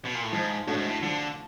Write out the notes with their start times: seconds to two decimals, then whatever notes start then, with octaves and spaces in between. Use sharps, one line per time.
0.05 B2
0.14 A#2
0.23 A2
0.32 G#2 F3
0.67 A2 A3 D4 F#4
0.77 G#2
0.87 A2
1.03 D3 F3